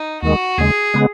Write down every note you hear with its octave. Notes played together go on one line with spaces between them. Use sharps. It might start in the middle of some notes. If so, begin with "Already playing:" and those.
Already playing: D#4
D#2 D#3 G#3 F#4
D#2 C#3 G#3 G#4
C#3 G#3 B3